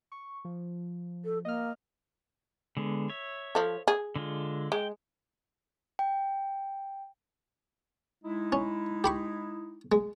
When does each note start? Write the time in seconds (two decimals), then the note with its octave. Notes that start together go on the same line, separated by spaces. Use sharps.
0.12 C#6
0.45 F3
1.25 A4
1.45 A#3 D#5 F6
2.77 D3 G#3 B3
3.10 C#5 E5
3.55 F3 A4
3.88 G#4
4.16 D3 G#3 F4
4.72 G#3 G5
5.99 G5
8.24 G#3 D#4 E4
8.52 C#4
9.04 G4 B5 C#6
9.92 G#3